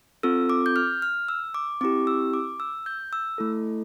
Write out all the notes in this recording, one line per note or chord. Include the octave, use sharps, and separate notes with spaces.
C4 F4 A4 E6
D6
G6
F6
F6
E6
D6
C4 E4 G4 D6
E6
D6
E6
G6
E6
A3 E4 A4